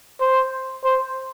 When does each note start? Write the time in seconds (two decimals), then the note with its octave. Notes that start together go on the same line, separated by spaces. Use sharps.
0.21 C5
0.85 C5